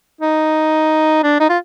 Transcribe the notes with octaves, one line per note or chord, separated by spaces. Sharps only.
D#4
D4
D#4
F4